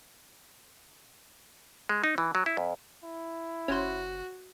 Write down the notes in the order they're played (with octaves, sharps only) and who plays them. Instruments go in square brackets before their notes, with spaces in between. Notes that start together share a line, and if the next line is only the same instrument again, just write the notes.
[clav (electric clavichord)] G#3
D#4
E3
F#3
E4
F2
[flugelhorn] E4
[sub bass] F#1 [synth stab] C#4 C5 [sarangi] F#4